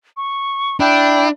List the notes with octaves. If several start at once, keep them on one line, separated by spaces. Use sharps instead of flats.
C#6
D4 E4 G5